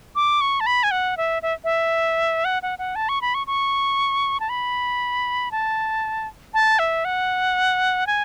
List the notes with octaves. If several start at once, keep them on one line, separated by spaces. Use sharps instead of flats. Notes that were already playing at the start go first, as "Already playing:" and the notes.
D6
C#6
A5
B5
G#5
F#5
E5
E5
E5
F#5
F#5
F#5
A5
C#6
B5
C#6
C#6
A5
B5
A5
A5
E5
F#5
G#5